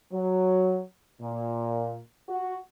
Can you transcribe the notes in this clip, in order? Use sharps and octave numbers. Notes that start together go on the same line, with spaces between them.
F#3
A#2
F#4